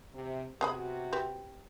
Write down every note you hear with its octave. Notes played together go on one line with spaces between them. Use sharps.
C3
C3 B3 F#4 G#4 B5
C4 G4 B4